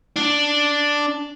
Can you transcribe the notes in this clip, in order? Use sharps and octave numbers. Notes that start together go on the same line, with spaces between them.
D4